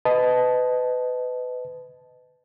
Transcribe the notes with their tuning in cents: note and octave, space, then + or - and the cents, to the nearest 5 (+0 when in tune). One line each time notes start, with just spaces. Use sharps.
B4 +25 D#5 +0 A5 -10